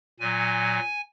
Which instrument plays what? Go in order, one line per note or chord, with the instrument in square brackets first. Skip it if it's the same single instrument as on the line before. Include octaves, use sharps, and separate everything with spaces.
[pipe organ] A#2 F#3 G#5